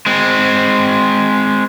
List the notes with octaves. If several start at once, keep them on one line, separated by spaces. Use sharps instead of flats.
G#3 C4